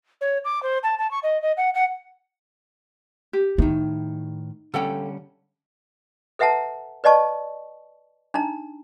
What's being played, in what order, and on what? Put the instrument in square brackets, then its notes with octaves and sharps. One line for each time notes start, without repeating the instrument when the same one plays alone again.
[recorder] C#5
D6
C5
A5
A5
C#6
D#5
D#5
F#5
F#5
[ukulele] G4
[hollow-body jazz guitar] A2 D#3 [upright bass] D#4
[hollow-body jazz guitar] D3 G3 C#4 [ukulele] A4 F5 G5
[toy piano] A4 B4 E5 F#5 A5 A#5
B4 D5 D#5 A5 C#6
D4 D#4 A#5